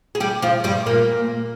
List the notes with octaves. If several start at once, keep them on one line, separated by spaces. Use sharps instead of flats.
G#4
G3 G4
F3 F4
G2 G3
A#2 A#3